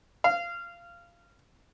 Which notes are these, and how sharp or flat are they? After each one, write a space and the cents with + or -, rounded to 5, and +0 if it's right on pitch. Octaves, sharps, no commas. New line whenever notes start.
F5 -20